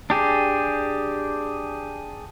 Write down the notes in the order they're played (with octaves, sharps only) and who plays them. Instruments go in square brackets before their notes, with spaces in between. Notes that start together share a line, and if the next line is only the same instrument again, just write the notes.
[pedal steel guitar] D4 G4 G#4